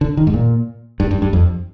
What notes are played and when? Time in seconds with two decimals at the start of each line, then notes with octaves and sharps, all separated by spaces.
0.01 D3
0.17 D#3
0.27 G#2
0.34 A#2
1.00 G2
1.11 G2
1.22 G2
1.33 F2